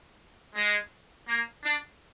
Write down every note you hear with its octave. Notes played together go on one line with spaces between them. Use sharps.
G#3
A#3
D4